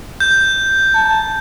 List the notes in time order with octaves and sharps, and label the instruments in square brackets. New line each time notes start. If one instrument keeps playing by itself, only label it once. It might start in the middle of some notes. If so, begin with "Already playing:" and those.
[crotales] G6
[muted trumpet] A5